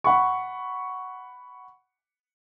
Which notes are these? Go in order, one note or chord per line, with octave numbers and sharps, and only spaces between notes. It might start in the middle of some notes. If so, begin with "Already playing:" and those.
F#5 B5 C#6